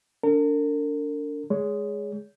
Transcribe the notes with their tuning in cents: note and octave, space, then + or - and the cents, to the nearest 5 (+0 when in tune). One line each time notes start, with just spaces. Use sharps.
D4 -25 A#4 -40
G#3 +0 G#4 +0 C#5 +25